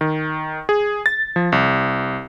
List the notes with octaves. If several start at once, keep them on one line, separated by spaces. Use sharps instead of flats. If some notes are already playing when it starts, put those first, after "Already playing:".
D#3
G#4
A6
F3
C2